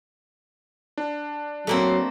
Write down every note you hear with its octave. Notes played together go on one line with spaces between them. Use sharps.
D4
F#3 A3 A#3 C4